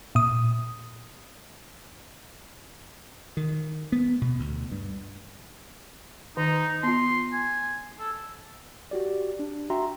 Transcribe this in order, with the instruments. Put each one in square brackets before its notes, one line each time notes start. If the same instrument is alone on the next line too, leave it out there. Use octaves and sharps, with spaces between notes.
[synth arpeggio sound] A#2 D#6
[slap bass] D#3
B3
B2
D2
G2
[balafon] D#3 [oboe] D#4
[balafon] B3 F4 [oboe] C6
[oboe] G#5
A4
[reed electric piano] F#4 G4 D5
D4
F#4 E5 G5 A#5 C6